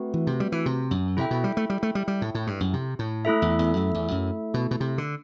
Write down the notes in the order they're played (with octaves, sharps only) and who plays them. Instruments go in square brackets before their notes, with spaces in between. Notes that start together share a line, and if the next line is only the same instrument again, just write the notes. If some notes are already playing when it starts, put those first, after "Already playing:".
Already playing: [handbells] A3 C4 F#4 B4
[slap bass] E3
C3
G3
E3
C3
F#2
[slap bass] C3 [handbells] E4 A4 E5 G5
[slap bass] B2
G3
A3
G3
A3
G3
G3
A2
A2
G2
F#2
C3
A2
[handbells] A3 E4 A4 E5
[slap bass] E2
E2
F#2
E2
F#2
B2
B2
C3
D3